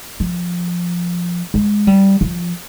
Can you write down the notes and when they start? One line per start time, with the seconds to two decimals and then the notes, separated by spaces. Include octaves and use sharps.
0.20 F3
1.54 G#3
1.87 G3
2.21 F3